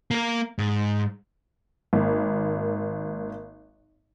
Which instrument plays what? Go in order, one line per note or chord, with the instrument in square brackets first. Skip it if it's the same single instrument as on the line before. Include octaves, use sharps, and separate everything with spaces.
[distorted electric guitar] A#3 A#4
G#2
[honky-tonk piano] G#1 A#3